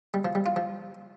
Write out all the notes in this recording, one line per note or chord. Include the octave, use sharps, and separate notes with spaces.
G3
F3
G3
F4
F3